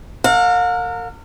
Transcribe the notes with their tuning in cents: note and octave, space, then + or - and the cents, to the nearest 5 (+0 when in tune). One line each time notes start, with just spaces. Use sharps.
A#4 -30 F5 +45